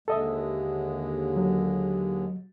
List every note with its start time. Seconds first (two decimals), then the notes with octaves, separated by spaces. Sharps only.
0.08 D#2 D3 G#3 A4 D#5 E5
1.36 F#3